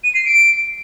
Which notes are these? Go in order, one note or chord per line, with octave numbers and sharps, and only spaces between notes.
D#7
C7
D7